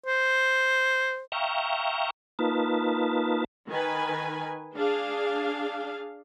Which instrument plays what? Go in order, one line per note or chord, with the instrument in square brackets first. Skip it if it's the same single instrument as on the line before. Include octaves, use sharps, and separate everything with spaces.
[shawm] C5
[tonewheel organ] E5 F5 G5 A#5 C#6
A#3 D#4 F4 B4 A5
[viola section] D#3 B4 G#5
D4 G#4 F5